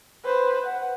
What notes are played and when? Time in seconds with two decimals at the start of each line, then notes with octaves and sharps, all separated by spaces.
0.25 B4 C5
0.67 F#5